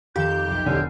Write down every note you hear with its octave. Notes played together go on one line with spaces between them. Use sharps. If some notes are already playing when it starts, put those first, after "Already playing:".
F2 D#3 G4 F5 G6 E7
F1 B1
E1 D3 C#4 G#5 F6 C7